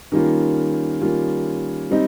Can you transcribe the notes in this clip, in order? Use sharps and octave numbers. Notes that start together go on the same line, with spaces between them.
D#3 G3 A#3 C#4 F4
D#3 G3 A#3 C#4 F4
G3 C4 D#4